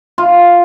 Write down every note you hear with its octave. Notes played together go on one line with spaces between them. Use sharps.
F4